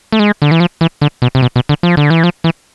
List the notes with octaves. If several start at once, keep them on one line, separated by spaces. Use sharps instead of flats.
A3
G#3
D3
E3
F3
E3
D3
B2
C3
B2
B2
D3
F3
D3
E3
F3
E3